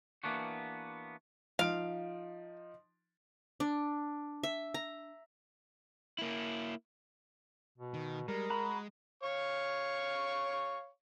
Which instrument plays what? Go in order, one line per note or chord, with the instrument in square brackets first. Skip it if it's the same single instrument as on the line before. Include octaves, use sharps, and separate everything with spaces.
[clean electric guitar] E3 A#3 B3 D4 F#4
[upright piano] F3 D#4 D7 [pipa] F5
[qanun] D4
E5
A#5
[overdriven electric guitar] A#3 E4
[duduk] B2
[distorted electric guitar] D#3
[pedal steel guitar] G3 [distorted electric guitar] G#3 [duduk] A#4
[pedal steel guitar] F#4 A#5 B5
[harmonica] C#5 F5 C#6